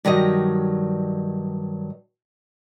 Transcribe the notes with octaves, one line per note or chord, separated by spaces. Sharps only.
G2 D#3 F#3 D#5